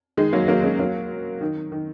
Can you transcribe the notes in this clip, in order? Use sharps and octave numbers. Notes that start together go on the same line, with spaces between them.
D#3 G#3
F#3 A#3
F#3 A#3
G#3 C#4
F#3 A#3
D#3
D#3